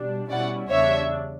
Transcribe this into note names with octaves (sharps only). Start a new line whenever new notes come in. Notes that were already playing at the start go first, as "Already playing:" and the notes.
Already playing: B2 G3 D4
B2 G3 C#4 E4 D5 F#5
E2 C#3 G3 D4 C#5 E5